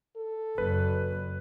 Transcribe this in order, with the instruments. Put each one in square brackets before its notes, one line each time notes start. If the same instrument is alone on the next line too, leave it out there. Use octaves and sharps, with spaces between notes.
[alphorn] A4
[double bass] F#1 [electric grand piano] B4